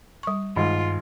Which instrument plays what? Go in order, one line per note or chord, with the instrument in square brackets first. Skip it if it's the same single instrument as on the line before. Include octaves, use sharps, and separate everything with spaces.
[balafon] G3 C#6
[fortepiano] G#1 [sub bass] G2 [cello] F4